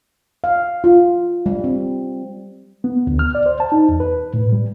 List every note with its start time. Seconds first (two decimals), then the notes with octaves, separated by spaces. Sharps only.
0.44 F5
0.84 F4
1.46 G3
1.64 C4
2.84 B3
3.07 D2
3.19 F6
3.35 D5
3.46 C5
3.60 A5
3.72 D#4
3.89 E2
4.00 B4
4.34 A2
4.52 G3